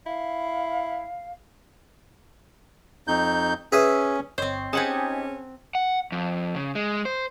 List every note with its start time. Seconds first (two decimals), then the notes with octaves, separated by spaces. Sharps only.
0.06 E4 F5
3.08 F2 D#4 G6
3.72 C#4 G#4 B4 E5
4.38 G1 C4 C5 C#5 D#5
4.73 C4 C#4 D#4 G4 G#4 F#5 G#5 A5
5.75 F#5
6.12 F2
6.55 C#3
6.75 G#3
7.05 C5